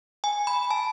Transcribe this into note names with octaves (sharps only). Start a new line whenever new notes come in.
G#5
B5
A5